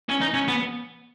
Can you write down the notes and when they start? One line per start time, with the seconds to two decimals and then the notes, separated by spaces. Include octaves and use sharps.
0.09 C#4
0.21 D#4
0.34 C#4
0.48 B3